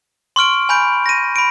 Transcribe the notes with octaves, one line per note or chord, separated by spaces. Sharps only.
C6 C#6 F6 D7
G#5 B5 G6 D7
A#6 D#7
B5 D7